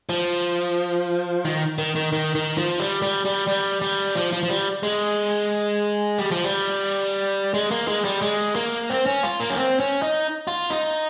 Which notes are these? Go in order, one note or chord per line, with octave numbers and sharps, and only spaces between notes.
F3
D#3
D#3
D#3
D#3
D#3
F3
G3
G3
G3
G3
G3
F3
F3
F3
G3
G#3
G3
F3
G3
G#3
A#3
G#3
G3
G#3
A#3
C4
C#4
F4
A#3
C#4
C4
C#4
D#4
F4
D#4